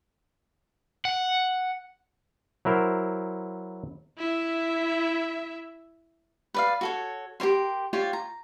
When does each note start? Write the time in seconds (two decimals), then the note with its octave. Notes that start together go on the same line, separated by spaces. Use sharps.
1.05 F#5
2.65 F#3 E4 A#4 C5
4.18 E4 E5
6.54 B4 D5 F5
6.81 F#4 A4 C#5
7.40 G4 A#4 C#5 C6
7.93 F4 G4 C#5 D5
8.13 A#5